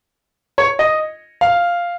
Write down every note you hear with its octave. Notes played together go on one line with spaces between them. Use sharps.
C#5
D#5
F5